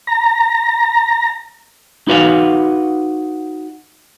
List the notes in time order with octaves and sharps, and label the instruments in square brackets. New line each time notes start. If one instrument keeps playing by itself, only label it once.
[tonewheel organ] A#5
[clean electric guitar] D#4 F#4 B4 F5